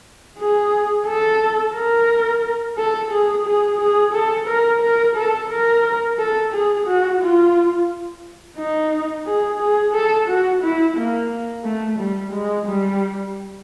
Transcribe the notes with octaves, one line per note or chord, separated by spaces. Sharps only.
G#4
A4
A#4
A4
G#4
G#4
G#4
A4
A#4
A#4
A4
A#4
A4
G#4
F#4
F4
D#4
G#4
G#4
A4
F#4
E4
A#3
A3
G3
G#3
G3